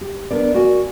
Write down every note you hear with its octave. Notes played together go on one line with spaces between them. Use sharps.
G4
B3 D4 A#4 D5
F#4 A#4 D5 F#5 G#5